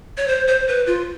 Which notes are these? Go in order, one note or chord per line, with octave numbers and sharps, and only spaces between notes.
C#5
C5
C5
B4
F4